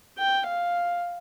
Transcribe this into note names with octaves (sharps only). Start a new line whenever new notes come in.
G5
F5